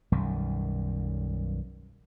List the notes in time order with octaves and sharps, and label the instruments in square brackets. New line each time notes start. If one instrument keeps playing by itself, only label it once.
[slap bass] B1 F#2 D#3 G3